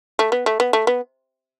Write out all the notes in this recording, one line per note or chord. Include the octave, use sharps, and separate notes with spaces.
A3
B3
A3
B3
A3
B3